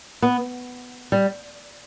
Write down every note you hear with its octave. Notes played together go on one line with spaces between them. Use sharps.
B3
G3